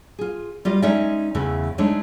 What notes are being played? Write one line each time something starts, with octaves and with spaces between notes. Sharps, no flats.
F4 G#4
G3 F4 G4 D#5
G#3 C#4 D#4 A4 D5 E5
E2 C#3 E3 A3
G#3 A3 D4 D#4 C#5